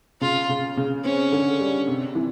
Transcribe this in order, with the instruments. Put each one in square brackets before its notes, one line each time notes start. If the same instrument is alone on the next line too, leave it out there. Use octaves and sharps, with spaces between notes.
[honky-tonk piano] C#3 [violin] F4
[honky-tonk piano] C#3
C#3
[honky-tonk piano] C4 [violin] C#4
[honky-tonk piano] D3
G3
C3
E3